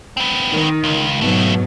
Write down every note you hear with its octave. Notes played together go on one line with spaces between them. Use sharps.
B3 C4
D#3
C#2
D#2 G#2 B2 F#3 A3